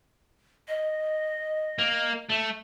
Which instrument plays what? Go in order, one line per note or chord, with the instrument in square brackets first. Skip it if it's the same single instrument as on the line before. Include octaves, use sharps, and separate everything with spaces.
[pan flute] D#5
[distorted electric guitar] A#3
A3